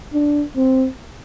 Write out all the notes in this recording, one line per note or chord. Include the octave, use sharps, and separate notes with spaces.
D4
C4